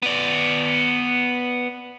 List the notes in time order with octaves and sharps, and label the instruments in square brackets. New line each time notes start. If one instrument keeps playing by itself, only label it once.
[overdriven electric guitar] B3 D5